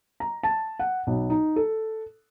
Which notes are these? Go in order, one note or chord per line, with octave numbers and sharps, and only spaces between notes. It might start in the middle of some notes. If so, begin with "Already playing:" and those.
A#5
A5
F#5
B1
D#4
A4